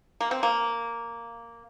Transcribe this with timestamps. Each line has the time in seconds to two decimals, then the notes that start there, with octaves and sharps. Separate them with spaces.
0.21 A#3
0.31 C4
0.43 A#3